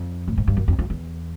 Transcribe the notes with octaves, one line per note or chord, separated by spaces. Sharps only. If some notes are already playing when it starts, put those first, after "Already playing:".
Already playing: F2
A2
G#2
G2
F#2
F2
F2
E2